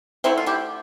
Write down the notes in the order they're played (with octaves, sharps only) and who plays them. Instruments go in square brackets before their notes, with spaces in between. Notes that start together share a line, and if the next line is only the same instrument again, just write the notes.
[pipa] D3 A3 C4 E4
F4
E4 G4